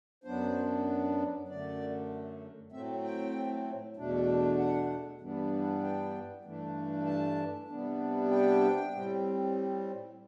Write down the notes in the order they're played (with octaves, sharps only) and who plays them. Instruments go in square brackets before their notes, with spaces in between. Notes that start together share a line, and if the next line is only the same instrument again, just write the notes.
[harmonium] F#2 F#3 B3 D4 C5
F#2 D3 A3 D5
A2 F#3 A3 C4 E5
G5
E2 B2 A3 D4
F#5
G2 E3 G3 B3 D4
G5
G2 E3 A3 D4
A5
C3 G3 B3 D4
G5
A2 G3 C4